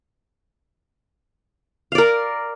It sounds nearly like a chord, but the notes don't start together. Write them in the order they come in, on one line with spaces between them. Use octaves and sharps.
F5 D5 A#4